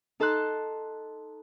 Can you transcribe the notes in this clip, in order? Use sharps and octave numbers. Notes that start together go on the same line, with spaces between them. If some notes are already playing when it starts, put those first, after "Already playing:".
D#4 A4 A5 C6 F#6